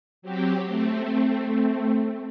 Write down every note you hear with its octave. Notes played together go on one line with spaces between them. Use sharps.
F#3 C4 G4
A3 C4